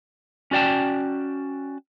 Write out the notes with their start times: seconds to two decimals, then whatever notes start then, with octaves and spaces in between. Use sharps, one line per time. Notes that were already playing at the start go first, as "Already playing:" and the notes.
0.51 C#4 F#4 D5 G5 A5